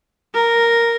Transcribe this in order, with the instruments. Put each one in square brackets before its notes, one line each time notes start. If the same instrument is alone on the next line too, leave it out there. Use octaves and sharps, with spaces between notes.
[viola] A#4